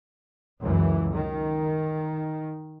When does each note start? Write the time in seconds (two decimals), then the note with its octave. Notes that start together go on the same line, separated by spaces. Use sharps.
0.60 C#2 F#2 E3
1.13 D#3